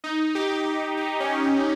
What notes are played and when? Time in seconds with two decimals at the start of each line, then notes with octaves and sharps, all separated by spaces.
0.04 D#4
0.35 G4
0.66 G4
0.97 D#4
1.20 C#4
1.44 C#4